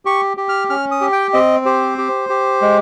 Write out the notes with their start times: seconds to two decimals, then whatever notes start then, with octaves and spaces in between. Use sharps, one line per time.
0.05 G4 C#6
0.37 G4
0.49 F6
0.70 C#4 F6
0.91 D#6
1.01 G4
1.12 G5
1.33 C4 D#5
1.66 G4 C5
1.98 G4
2.29 G4
2.62 G#3